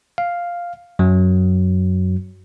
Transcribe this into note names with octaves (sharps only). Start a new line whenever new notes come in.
F5
F#2 F#3